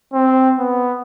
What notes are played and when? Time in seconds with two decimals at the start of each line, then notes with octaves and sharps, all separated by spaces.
0.13 C4
0.58 B3